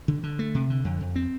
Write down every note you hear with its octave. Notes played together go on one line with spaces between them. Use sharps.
D3
D3
A3
C3
D3
F2
F2
C4